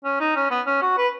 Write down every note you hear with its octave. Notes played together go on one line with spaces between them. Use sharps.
C#4
D#4
C#4
B3
C#4
F#4
B4